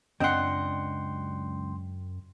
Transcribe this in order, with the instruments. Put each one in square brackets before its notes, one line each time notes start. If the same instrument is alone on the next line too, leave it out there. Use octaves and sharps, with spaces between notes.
[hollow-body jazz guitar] C#2 C4 D4 [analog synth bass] F#2 [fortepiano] D#5 F#5 [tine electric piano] G5 C6